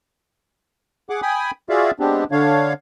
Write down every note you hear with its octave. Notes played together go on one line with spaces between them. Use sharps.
G#4 F#5 D6
G5 G#5 B5 D#6
F4 F#4 G#4 D5 E5 F5
G#3 B3 C4 D4 G4
D3 D4 C#5 F5